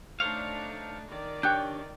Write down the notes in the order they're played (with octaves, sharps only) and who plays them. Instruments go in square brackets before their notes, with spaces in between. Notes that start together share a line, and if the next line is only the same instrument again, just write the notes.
[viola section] A3 D4 D#4 [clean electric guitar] C5 C#5 F5
[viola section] D#3 D5
[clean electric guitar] D4 G4 C#5 [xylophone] G5 F#6 G6